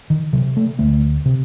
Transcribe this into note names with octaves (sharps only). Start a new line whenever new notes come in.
D#3
C3 F#3
A3
D2 A3
C3